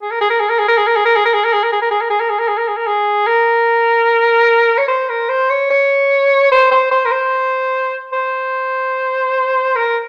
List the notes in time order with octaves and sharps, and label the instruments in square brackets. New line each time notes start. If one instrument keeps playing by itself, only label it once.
[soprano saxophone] G#4
A#4
G#4
A#4
G#4
A#4
G#4
A#4
G#4
A#4
G#4
A#4
G#4
A#4
G#4
A#4
G#4
A#4
G#4
A#4
G#4
A#4
G#4
A#4
G#4
A#4
G#4
A#4
G#4
A#4
G#4
A#4
C#5
C5
A#4
C5
C#5
C#5
C5
C5
C5
A#4
C5
C5
A#4